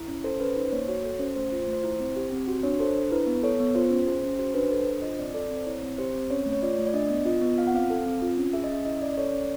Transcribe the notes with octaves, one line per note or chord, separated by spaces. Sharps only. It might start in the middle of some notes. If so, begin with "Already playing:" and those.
Already playing: E4
C#4
A4 C5
C#4 B4
D#4 C5
A#3 C#5
F#4 C#5
A4
C#4 C5
A3 C5
F4
C5
A3
C5
E4
C4
G4
C4
F#4
D4 C#5
A4 C5
D4
E4 B4
B3
A4 C#5
B3
F4 C5
C#4
G#4 C5
C#4
F#4 C5
D4 B4
A4 C5
D4 C5
F4 D#5
C4 D5
A4 D5
C4
C5
E4 C#5
C4
G4 C5
C4
C#4 C#5
A3
C#5
F4 D5
A3
D5
D4 D#5
B3
F4 D#5
B3
F4 F5
F#5
C4 F5
A4
C4
F4
C#4
G#4 E5
D#5
C#4 E5
E4 D#5
C#4 D5
D5
A4 C#5
C#4 D5